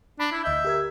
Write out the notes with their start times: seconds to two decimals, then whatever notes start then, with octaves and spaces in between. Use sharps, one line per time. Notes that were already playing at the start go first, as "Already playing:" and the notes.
0.20 D4 B5
0.32 E4
0.44 D2 D#5 E5 G6
0.64 G4 A#4 G#6